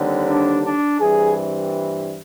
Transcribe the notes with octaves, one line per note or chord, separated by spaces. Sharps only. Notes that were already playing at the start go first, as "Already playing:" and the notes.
Already playing: D#2 D3 G3 C4
D4
D4
G2 E3 G3 C4 G#4